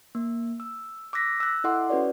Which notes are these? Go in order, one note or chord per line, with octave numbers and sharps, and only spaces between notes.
A#3
E6
D6 E6 F#6 A#6 B6
E6 F#6
E4 A4 D#5 F#5 C6 D6
C#4 F#4 B4 C#5 D5